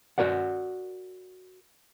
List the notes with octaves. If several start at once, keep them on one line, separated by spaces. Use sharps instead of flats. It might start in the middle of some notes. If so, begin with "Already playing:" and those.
F#4 A#4 D5 F#5